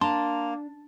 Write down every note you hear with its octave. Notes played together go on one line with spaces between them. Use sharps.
A#3 D4 A5 A#5 C6